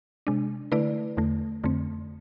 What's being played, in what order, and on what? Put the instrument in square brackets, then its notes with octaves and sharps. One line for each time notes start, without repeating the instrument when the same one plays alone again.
[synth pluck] C3 G#3 D4
D3 A3 E4 B4 D5
E2 D3 A3
F2 D3 A3 C4